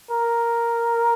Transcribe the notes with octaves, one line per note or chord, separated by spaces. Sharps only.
A#4